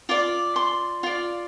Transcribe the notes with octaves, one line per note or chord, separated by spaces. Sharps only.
F4 D5 D6
C6
F4 D5